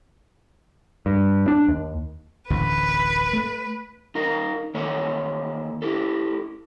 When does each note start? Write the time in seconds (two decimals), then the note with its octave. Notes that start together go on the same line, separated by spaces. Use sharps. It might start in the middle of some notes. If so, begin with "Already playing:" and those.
1.06 G2
1.48 D4
1.68 D#2
2.50 D1 A1 D3 B4
3.33 A3
4.15 D#4 F4 A#4
4.74 D#3 A#3 A4 C#5
5.82 E4 G4 A4